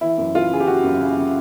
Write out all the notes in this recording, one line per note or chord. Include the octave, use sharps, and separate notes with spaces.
E3 E4
F#2
E3 F4
C#3 G#4
G4
C#3 F#4
F#2
C#3
C#3